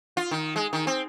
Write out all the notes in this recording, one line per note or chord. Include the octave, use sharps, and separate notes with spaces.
F4
D#3
G#3
D#3
C4